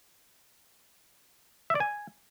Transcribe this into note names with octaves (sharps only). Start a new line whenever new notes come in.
E5
D5
G#5